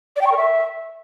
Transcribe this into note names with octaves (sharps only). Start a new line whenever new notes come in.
D5
G5
C#6
A#4
E5